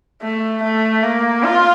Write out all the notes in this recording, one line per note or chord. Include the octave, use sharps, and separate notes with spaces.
A3
A3
A#3
F4